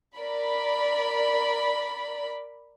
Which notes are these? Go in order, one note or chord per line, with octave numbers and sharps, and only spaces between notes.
A#4 D5 B5